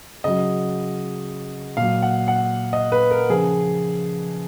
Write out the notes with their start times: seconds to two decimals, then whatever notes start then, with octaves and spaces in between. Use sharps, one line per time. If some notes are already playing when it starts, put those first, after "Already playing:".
0.24 C#3 F#3 D#5
1.77 A#2 F#3 F5
2.02 F#5
2.28 F#5
2.73 D#5
2.92 B4
3.11 A#4
3.29 C#3 F3 G#4